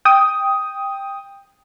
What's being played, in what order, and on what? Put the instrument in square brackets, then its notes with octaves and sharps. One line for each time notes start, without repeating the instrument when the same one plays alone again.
[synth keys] G5 D#6